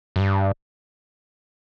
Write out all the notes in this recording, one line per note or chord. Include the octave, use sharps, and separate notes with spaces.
F#2
G2